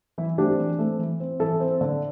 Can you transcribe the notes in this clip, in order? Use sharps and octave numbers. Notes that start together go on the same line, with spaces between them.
E3 E4
A3 C4 D4 G4
E3
A3 C4
E3
C4
E3 E4 A4
C4
D3